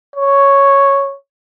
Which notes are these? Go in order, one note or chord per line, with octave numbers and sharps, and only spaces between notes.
C#5